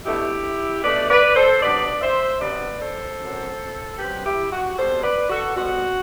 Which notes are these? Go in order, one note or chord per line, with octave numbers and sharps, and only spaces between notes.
B2 A3 D4 E4 G4
B2 A3 D4 B4 D5
B4 D5
A4 C5
C3 F#3 B3 D4 B4 D5
C5 E5
C3 F#3 B3 D4 B4 D5
A4 C5
F#2 F#3 C4
F#2 F#3 C4 G4 B4
E4 G4
F#4
B2 G3 C4 A4 C5
B4 D5
F#4 A4
B2 G3 C4 F#4